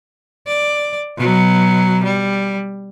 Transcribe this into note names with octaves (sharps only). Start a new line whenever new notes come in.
D5
B2 F#3
G3